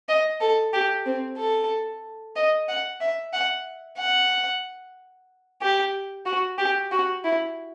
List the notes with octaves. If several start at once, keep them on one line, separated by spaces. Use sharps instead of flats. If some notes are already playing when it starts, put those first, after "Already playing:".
D#5
A4
G4
C4
A4
D#5
F#5
E5
F#5
F#5
G4
F#4
G4
F#4
E4